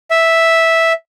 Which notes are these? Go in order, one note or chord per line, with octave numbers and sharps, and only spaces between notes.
E5